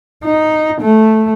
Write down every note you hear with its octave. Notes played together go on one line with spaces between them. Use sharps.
D#4
A3